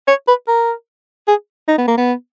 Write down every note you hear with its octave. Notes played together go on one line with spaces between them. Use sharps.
C#5
B4
A#4
G#4
D#4
B3
A#3
B3